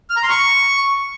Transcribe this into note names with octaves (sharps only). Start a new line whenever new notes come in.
F6
A#5
C6
C#6